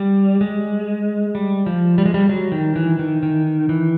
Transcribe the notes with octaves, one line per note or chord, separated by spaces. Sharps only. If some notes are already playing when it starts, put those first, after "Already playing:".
Already playing: G3
G#3
G3
F3
G3
G#3
G3
F#3
D#3
E3
D#3
D#3
E3